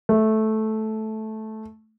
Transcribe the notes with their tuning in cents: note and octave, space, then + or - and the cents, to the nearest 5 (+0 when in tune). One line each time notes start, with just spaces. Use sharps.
A3 -10